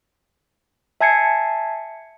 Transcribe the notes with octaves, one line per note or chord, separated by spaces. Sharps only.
E5 G#5 A5 G#6 C7 C#7